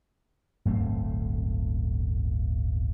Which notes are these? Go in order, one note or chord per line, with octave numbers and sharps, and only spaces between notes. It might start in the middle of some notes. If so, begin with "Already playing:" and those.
D1 G1 A3 C4